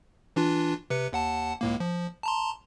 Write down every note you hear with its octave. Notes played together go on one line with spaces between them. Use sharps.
E3 D4 F4
C3 B4 C#7
D#2 F#5 A5
C#2 A2 A#3
F3
A5 A#5 C6